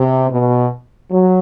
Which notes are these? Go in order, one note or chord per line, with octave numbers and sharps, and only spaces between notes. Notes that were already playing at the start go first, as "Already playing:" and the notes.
Already playing: C3
B2
F#3